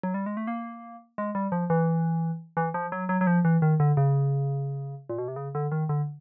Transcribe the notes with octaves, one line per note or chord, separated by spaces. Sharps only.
F#3
G3
G#3
A3
A#3
G#3
G3
F3
E3
E3
F3
F#3
F#3
F#3
F3
E3
D#3
D3
C#3
A#2
B2
C3
C#3
D3
D#3
D3